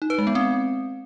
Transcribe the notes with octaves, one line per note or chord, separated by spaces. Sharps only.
D#4
B4
G#3
B3
C4